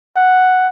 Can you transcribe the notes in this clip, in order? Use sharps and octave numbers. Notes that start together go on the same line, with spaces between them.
F#5